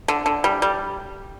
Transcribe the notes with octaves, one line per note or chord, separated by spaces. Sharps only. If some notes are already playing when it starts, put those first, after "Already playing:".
D3
D3
G3
G3